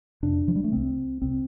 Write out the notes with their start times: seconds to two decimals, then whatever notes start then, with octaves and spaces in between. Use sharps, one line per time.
0.23 F2 C3 D4
0.48 F3
0.56 G3
0.64 A3
0.72 C2 C3 C4
1.22 C2 C3 C4